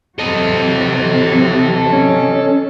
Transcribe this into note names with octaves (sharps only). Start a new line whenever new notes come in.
C3 E3 F#3 A4 D#5
C#4